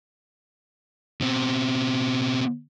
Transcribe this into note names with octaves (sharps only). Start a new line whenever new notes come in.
B2 C4